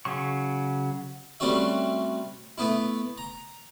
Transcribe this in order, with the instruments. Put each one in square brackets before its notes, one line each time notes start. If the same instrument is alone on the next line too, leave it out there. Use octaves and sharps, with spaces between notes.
[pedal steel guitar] C#3 F#3 C#6
[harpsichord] G3 A3 C4 C#4 F#4 E5
A3 B3 E4
A#5